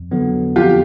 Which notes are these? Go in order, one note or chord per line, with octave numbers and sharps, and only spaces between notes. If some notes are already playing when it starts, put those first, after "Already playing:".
Already playing: F2
D3 F#3 B3
F2 F4 G4